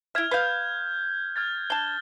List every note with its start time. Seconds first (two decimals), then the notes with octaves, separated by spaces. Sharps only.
0.15 E4 E5 F6 G#6
0.31 B4 D#5 F5 G6 G#6
1.36 F6 G#6 A6
1.70 D4 A5 G7